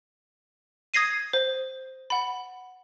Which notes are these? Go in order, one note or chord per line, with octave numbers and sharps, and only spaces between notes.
D#6 G#6 A#6 C7 D#7
C5
F#5 B5